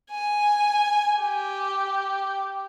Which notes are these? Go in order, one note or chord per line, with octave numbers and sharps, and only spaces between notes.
G#5
G4